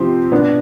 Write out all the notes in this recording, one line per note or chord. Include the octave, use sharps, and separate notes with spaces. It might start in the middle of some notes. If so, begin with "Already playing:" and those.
Already playing: C3 F3 C4 G4 C5
B2 B3 D4